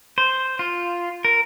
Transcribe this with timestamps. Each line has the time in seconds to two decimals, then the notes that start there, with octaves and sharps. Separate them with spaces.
0.18 C5
0.59 F4
1.25 A#4